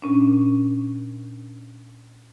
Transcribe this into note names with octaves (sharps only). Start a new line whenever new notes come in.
A#2 C#4 D4